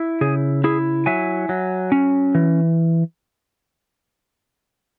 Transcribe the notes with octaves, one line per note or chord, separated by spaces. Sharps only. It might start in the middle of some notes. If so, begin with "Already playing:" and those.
Already playing: E4
C#3 G#4
E4 G#4
F#3 E5 G#5
F#3
C#4
E3